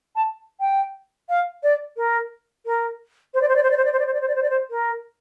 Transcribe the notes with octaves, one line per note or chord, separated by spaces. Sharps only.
A5
G5
F5
D5
A#4
A#4
C5
D5
C5
D5
C5
D5
C5
D5
C5
D5
C5
D5
C5
D5
C5
D5
C5
A#4